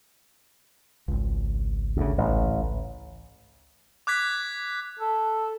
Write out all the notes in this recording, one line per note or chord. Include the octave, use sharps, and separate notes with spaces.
G#1 C#2
D2 C#3
A1
D6 F#6 G#6 B6
A4